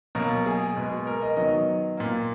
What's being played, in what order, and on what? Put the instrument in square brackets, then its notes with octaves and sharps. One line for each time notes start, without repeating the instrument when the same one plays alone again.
[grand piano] B2 F#3 A#3 A#4
G#4
B2 G#3 B3
A#4
D#5
D#3 F#3 B3 D#5
A#2 A#3